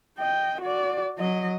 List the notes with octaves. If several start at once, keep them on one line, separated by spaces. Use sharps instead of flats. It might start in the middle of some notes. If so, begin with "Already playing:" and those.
D#5 G5
F#4 D5
F#3 D#5